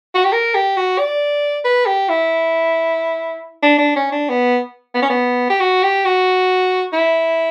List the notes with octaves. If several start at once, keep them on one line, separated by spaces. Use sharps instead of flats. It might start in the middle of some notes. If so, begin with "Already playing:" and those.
F#4
G4
A#4
G4
F#4
D5
B4
G4
E4
D4
D4
C#4
D4
B3
B3
C#4
B3
G4
F#4
G4
F#4
E4